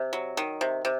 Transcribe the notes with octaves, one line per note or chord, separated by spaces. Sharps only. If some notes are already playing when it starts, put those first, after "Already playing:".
Already playing: C3
F#3
D#3
C3
C3